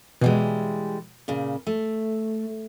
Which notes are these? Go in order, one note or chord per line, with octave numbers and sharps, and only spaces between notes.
B2 E3 G3 G#3
A#2 C#3
A3